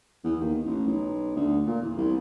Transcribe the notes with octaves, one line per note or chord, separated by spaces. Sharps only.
E2
D#2
A1
B1
D2
A#2
E2
C2